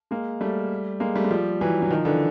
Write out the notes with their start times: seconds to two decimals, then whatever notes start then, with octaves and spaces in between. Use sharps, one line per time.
0.11 G#3 A#3
0.41 G3 A3
1.00 G#3 A#3
1.16 G3 A3
1.24 G#3
1.31 F3 G3
1.61 E3 F#3
1.82 F#3
1.90 D#3 F3
2.05 D3 E3